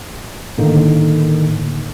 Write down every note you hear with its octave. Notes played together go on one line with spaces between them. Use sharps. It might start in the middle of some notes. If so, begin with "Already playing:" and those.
A2 D3 D#3 A#3 D#4